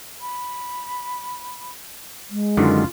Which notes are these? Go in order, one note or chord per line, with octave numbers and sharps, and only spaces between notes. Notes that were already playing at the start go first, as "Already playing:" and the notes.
B5
G#3
F#2 D3 D#3 F4